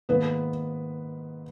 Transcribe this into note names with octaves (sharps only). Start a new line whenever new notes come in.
G#2 D#3 A#3 B3 B4